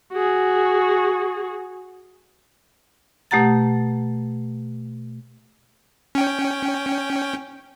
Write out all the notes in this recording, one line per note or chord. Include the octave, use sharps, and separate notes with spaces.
F#4 G#4
B2 A3 G4 F#5 A#5 A6
C#4 G5